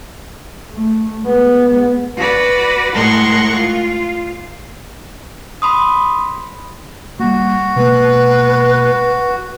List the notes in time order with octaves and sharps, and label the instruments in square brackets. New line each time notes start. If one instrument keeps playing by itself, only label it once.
[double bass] A3
G#3 B3
[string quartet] F#4 B4 D5
A2 G#3 A#4 F#5 C6 C#6
F4
[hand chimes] B5 C6 D#6
[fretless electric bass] G3 A#3 [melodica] F#4
[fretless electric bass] B2 G#3 A#3 [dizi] B4